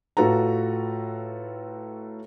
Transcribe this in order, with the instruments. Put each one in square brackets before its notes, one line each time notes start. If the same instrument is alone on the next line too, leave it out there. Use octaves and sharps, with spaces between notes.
[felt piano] A2 F4 F#4 A4 B4 A#5